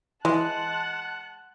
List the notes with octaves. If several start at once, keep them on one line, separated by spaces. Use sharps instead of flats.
E3 G#3 F#5 A5 F#6